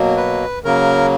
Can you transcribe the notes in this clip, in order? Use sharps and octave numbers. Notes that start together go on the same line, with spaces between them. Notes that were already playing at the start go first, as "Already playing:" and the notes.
Already playing: B2 F#3 A#3
B4
C#3 F#3 A#3 A#4